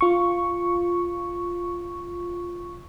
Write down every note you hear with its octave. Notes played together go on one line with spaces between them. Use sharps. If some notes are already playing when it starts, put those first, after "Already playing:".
F4 C#6